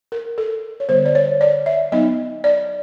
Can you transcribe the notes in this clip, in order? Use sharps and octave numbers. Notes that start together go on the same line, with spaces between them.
A#4
A4
C#5
D3 G3 B3 C5
D5
C#5
D5
E5
F#3 B3 D#4 D#5
D5